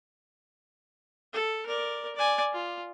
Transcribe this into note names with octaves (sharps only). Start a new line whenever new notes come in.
A4
A#4 D5
D5 G#5
F4